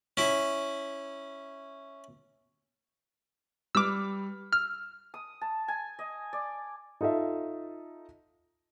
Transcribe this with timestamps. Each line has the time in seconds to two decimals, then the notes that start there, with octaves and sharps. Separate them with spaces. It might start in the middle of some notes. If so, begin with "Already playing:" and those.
0.17 C#4 E4
3.75 G3 B4 D6 E6 F6
4.53 E6 F6
5.14 D#6
5.41 A5
5.68 G#5
5.99 D#5
6.33 D5
7.01 D#4 F4 A4 D#5 E5